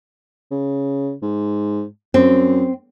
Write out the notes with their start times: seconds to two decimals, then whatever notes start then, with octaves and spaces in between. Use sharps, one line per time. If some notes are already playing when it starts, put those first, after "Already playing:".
0.51 C#3
1.22 G#2
2.14 F#2 C4